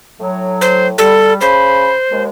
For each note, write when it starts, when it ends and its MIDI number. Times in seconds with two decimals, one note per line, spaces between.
0.20 0.94 45
0.20 0.94 54
0.61 0.87 72
0.98 1.35 55
0.98 1.34 69
1.41 1.90 49
1.41 2.23 72
1.41 1.90 83
2.10 2.29 39
2.10 2.29 56